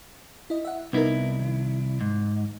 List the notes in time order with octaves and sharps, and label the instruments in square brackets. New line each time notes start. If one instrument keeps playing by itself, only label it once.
[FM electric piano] E4 D#5
E5 F#5
[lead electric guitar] C2 E4 [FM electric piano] B3 D#4 A#4
[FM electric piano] D#3
[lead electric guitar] G#2